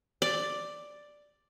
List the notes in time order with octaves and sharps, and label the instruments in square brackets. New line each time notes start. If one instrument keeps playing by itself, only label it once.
[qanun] D5